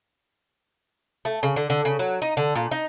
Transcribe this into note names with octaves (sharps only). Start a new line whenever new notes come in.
A3
C#3
D3
D3
C#3
F#3
D#4
D3
A#2
D#4